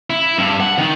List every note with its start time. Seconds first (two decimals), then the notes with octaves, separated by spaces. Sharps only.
0.10 E4
0.38 G2
0.60 F#5
0.78 D#3